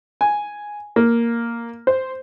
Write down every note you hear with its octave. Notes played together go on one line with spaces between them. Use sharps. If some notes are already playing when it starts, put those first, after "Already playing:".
G#5
A#3
C5